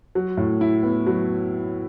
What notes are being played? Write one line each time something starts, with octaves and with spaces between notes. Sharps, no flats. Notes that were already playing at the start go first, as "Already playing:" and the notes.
F#3
A2
E4
B3
F#3